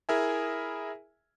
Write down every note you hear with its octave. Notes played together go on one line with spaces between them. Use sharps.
E4 G#4 A#4 E5 G#5